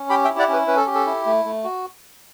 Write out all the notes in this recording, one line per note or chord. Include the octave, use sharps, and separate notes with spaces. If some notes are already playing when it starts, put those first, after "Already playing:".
Already playing: C#4
G4 G5 B5
E5 G5
E4
D5 F#5
C#4 B4
C#4 B4
A4
G4
A4
E4
A3
A3
F#4